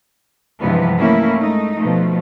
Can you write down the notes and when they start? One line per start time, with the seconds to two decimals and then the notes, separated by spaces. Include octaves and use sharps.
0.61 G2 C3 E3 F3 G#3 B3
0.98 A3 A#3 C#4 E4
1.39 G#3 A3 D#4
1.77 B2 F3 A3